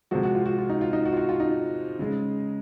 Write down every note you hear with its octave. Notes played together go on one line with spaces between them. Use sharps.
C3 F3 G#3 F#4
F#4
F4
F#4
F4
D#4
F4
D#4
F#4
F4
F#4
F4
D#4
C#3 G#3